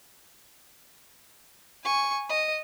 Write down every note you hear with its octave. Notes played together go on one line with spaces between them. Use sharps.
G#5 C#6
D#5